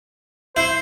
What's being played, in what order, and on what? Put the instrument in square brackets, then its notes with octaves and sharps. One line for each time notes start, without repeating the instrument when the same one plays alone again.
[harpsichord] E4 [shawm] C5